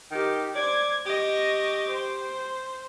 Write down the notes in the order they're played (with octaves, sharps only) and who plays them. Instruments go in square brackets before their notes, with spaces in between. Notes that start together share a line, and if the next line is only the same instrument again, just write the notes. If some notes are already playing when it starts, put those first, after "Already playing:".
[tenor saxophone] D#3 [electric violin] G4
[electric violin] C5 G#6 [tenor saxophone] D5
[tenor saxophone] G4 [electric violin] D#5 C#6
[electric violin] C5